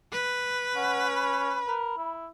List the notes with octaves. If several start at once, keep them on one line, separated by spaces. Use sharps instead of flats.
B4
C#4 F#5
B5
A#4
E4